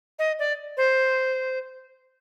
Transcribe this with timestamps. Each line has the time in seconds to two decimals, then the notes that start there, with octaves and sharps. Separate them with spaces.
0.19 D#5
0.39 D5
0.77 C5